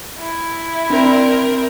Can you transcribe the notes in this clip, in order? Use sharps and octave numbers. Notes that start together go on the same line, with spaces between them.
E4
C4 D4 A#4